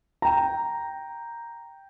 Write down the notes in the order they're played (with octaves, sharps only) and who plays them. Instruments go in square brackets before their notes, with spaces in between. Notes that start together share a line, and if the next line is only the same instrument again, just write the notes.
[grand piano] G5 A#5